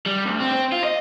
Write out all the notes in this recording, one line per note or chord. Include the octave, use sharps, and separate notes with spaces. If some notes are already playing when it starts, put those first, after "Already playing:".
G3
D2
C4
C4
F4
D#5